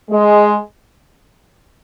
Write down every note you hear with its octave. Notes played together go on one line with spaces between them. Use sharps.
G#3